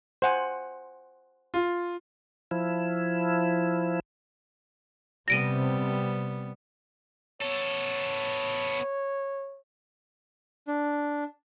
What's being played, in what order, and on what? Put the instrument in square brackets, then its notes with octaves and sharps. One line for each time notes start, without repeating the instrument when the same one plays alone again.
[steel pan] C5 F#5 G#5
[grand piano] F4
[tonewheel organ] F3 E4
[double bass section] C3 [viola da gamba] G3 B3 [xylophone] A#6 D7 D#7
[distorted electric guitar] B3 A4 [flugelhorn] C#5
[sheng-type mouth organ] D4